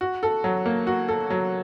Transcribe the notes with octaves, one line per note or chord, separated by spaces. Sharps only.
F#4
A4
F#3
A#3
F#4
A4
F#3